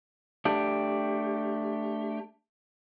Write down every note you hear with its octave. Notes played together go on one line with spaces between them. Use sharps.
A3 D4 G4